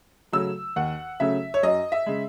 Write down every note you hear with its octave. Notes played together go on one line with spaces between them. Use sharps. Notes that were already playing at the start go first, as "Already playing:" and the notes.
C#3 F#3 A3 C#4 E6
D#2 F#5
C#3 F#3 A3 C#4 E5
C#5
F#2 D#5
E5
C#3 G#3